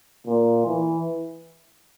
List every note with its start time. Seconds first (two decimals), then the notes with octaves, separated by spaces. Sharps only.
0.27 A#2
0.67 E3